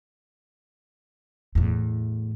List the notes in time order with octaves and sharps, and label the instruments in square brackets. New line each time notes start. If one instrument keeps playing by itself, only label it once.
[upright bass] E2 A2